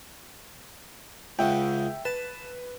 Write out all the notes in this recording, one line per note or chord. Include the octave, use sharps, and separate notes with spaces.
C#2 C#3 E5 F#5 G5
B4 A5